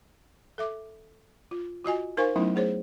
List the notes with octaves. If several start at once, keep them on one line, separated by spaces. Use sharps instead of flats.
A4 E5 D6
F4
F4 F#4 D#5 G#5
D#4 A#4 C5 F5 G#5 C#6
F#3 A3 B3 C#4 D#4 E4
A3 G#4 C5 C#5